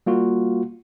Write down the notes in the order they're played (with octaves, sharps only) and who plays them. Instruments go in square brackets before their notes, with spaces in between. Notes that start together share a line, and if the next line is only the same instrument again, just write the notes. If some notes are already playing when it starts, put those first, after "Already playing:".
[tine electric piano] G3 A#3 F4 F#4